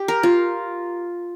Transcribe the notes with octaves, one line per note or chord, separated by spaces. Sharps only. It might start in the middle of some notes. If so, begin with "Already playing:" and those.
Already playing: G4
A#4
F4